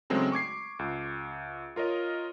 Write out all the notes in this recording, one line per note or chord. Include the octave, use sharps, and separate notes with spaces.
C#3 F#3 G#3 A3 C4 D#4
C#6 D6 G#6 C7
C#2
F4 A#4 C#5 D#5